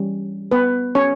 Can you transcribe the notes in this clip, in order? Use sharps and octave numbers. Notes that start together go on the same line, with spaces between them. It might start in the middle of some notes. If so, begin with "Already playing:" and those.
Already playing: E3 G3 C#4
B3 B4
C#4 C#5